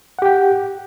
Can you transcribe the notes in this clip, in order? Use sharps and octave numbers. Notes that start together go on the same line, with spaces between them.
G4 F#5 G5